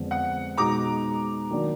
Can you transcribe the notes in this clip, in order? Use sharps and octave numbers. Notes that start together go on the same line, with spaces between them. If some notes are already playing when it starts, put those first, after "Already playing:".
Already playing: F2 D3 G#3 B3
F#5
B2 G#3 D#4 A#5 D6
D#3 F#3 A#3 D4